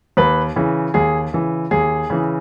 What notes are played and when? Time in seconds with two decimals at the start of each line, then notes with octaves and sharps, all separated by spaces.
0.17 D#2 B4
0.56 C#3 E3
0.94 D#2 G#4
1.33 C#3 E3
1.71 D#2 G#4
2.10 C#3 E3